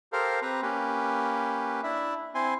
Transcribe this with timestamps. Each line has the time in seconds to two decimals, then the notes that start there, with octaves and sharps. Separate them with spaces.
0.13 G4 A4 A#4 C5 F5
0.42 C4 G4 B4 A#5
0.62 A#3 C#4 G4 B4
1.83 D4 E4 E5
2.35 C4 E4 G#5 C6